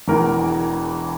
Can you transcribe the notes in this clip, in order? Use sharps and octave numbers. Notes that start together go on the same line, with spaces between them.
E1 E2 E3 A#4